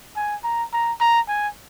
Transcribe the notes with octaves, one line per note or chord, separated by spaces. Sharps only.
G#5
A#5
A#5
A#5
G#5